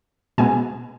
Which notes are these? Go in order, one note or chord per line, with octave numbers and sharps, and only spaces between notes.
B2 G#3 B3 G#5